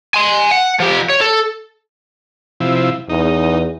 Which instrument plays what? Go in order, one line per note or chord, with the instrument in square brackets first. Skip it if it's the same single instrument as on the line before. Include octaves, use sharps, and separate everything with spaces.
[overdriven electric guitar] G#5 C6
F#5
F3 G4
C#5
A4
[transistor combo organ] C3 F3 E4
[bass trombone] E2 [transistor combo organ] D#4